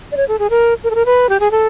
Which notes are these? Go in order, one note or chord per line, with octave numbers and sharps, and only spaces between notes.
D5
C#5
A4
G#4
A#4
A#4
A4
A#4
B4
G4
G#4
A4